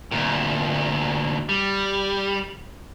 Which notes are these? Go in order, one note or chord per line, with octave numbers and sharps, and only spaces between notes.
D2 A#2
G3